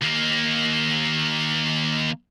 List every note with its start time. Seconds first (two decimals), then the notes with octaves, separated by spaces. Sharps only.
0.01 D#2 A#3